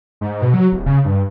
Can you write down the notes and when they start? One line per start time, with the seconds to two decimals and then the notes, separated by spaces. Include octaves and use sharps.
0.21 G#2
0.42 B2
0.54 F#3
0.72 D1
0.86 C#3
1.05 G2